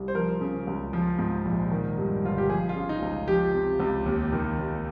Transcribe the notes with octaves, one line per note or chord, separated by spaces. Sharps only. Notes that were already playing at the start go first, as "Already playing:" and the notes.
Already playing: C2
C5
F3 A#4
C#3
C#2
F3
G#2
A#1
D#3
G2
G1 F4
G4
F3 G#4
F4
C#3
D#4
C#2
F3 G4
C3
C#2
D#2
D#3
D#2